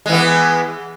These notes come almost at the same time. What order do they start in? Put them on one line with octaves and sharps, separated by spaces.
G#3 E3 B3